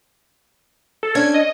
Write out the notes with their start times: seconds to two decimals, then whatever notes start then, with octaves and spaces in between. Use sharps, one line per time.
1.03 A4
1.15 C#4 D4 A4 G#6
1.34 D#5